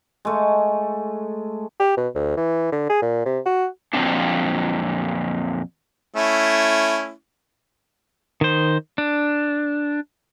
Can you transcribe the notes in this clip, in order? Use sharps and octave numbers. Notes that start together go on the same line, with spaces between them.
G#3 A3
G4
B2
D2
E3
D3
G#4
A#2
C3
F#4
F2 A#2 D#3 F#3 C4 D4
A3 C#4 E4
D#3 C5
D4